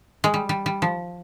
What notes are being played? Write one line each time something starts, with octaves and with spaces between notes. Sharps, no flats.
G#3
G3
G3
G3
F3